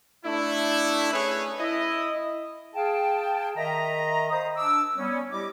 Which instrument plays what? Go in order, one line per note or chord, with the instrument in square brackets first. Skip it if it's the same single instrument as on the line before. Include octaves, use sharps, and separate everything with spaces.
[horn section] A3 D4 E4
A3 C#4 G#4 B4 C#5
E4 D#5
[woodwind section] G#4 F5 G5 A5
D#3 D#5 E5 A#5
C5 F5 A#5 B5 D#6
D4 D6 E6
G3 B3 C#4
G3 E4 G4 D#5 D6